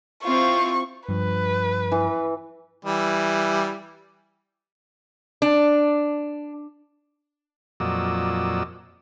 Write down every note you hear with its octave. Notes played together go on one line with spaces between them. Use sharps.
C4 E4 F4 C#6
G2 F3 B4
E3
E3 G3
D4
F2 A#2 F#3 D5 D#5 E6